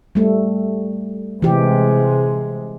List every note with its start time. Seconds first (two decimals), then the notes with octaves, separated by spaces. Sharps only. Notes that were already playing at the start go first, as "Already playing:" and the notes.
0.15 G3 A3
1.42 C3 E3 G#3 G4